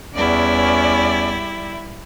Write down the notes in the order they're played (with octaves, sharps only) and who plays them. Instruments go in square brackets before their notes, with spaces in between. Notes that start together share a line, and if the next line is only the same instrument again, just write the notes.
[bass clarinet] E2 [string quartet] G3 E4 [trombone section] B3 C#4 [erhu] D5